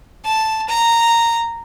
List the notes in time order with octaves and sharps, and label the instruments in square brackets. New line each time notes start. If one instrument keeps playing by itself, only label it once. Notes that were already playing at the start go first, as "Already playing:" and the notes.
[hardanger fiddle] A5
A#5